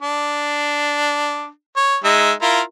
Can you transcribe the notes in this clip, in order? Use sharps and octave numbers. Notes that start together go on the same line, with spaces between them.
D4
C#5
G#3 D#4 E5
E4 F4 A#4